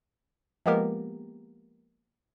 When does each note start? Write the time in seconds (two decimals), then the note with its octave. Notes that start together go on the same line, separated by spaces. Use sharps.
0.66 F3 G#3 A#3 B3 G4 A#4